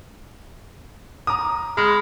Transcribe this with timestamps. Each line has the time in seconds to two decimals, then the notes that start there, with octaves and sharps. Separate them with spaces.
1.27 A#5 D6 D#6
1.77 G#3 B5 F6